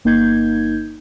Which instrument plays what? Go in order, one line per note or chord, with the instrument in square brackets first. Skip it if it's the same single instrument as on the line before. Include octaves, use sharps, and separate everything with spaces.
[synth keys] G1 A#3 D#4 G6 G#6